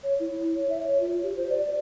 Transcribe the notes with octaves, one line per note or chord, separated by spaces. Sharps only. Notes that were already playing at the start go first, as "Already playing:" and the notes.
C#5
E4
C#5
E5
C#5
F4
G4
C5
D5
D5